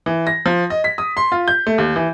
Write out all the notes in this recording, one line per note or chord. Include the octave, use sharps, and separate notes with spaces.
E3
A#6
F3
D#5
B6
D#6
C6
F4
G6
A3
D#2
E3